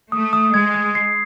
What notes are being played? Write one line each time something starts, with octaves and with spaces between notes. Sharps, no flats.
A3 D#6
D#6
G#3 G#6
G#6
C7